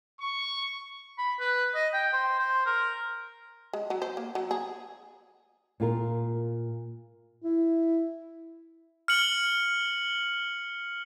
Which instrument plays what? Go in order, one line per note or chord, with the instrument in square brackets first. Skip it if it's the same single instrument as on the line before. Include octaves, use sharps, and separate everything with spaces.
[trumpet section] C#6
[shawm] B5
B4
D#5
G5
C5
C5
A#4
[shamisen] G#3
F#3
C5
A#3
F#3
G#4
[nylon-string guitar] A#2 F4 A#4
[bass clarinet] E4
[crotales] F6 C#7 F#7